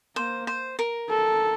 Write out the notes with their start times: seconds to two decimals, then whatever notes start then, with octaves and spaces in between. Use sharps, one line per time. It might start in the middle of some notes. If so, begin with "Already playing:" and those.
0.16 A#3 C5
0.47 C5
0.79 A#4
1.10 A4